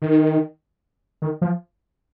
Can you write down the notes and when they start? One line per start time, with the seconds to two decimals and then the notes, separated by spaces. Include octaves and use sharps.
0.02 D#3
1.22 D#3
1.42 F3